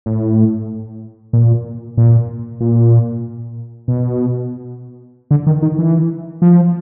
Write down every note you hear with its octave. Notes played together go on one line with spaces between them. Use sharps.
A2
A#2
A#2
A#2
B2
D3
D#3
D#3
E3
F3